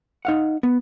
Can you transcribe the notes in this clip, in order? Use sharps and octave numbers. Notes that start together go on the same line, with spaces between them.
D#4 F5 F#5
B3